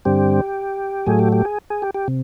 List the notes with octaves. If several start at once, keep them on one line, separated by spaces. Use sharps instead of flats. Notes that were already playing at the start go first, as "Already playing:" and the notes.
G2 D3 G3 C4 G4
A2 F#3 A3 G#4
G4
G4
G#4
G#4
G4
G4
C3